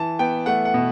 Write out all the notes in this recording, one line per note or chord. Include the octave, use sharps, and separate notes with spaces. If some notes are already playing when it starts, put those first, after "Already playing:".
Already playing: E3 A5
B3 G5
A3 F#5
F#5
B2